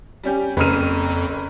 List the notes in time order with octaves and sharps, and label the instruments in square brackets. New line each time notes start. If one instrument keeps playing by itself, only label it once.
[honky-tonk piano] G3 C#4 G4
[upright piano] F#1 D#7 [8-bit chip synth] F2 [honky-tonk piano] B4 F6